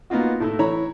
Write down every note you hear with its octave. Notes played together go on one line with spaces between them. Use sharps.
A#3 B3 D#4 F4 F#4
A2 A3 E4
E3 E4 C#5 A#5 B5